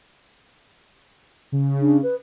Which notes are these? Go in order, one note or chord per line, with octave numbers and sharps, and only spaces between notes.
C#3
D4
B4